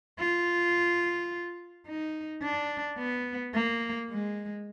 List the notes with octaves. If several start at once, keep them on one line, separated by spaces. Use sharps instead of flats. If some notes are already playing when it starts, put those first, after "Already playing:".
F4
D#4
D4
B3
A#3
G#3